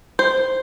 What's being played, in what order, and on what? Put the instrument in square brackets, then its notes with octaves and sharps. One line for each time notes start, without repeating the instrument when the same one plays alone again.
[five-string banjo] C5